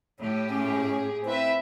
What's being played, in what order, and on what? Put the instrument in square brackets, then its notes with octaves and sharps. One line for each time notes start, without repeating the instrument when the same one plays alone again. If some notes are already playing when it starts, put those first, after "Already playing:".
[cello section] A2 G4 [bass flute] C#5
[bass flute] C#4 [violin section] G#4
[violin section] C4 B4 E5 [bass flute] E4